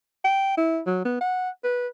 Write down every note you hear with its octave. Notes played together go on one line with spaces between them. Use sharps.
G5
E4
F#3
B3
F#5
B4